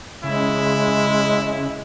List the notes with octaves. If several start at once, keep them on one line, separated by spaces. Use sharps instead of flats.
C#3 G#3 E4